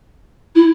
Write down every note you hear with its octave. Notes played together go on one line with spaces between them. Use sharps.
E4